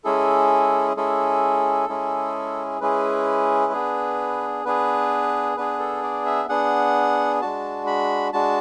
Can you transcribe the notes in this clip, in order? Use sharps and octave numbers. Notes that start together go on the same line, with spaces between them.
G#3 C#4 E4 G#4 A4
G#3 C#4 E4 G#4 A4
G#3 C#4 E4 G#4
G#3 C#4 E4 G#4 B4
B3 D4 G#4
B3 D4 G#4 B4
B3 D4 G#4 B4
A4
D5
E5
B3 D4 G#4 F#5
G#3 D4 F#4 A5
B5
G#3 D4 F#4 A5